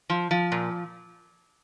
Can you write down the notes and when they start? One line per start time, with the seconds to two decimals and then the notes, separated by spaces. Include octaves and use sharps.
0.10 F3
0.31 F3
0.52 A#2